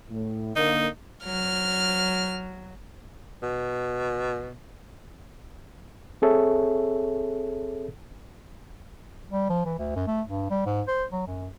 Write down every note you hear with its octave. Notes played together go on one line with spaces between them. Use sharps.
A2
D3 A#3 D#4
F#3 F6
B2
C4 G#4 A4 C#5 E5
G3
F3
E3
D2
F#2
A3
G2
G3
G#2
C5
F#3
F#2